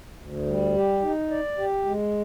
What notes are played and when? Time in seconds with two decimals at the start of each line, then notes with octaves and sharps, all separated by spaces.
0.18 D2
0.46 G3
0.74 G4
1.02 D#4
1.30 D5
1.58 G4
1.85 G#3